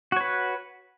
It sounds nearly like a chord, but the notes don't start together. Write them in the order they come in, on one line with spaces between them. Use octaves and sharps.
F#4 C#5 B4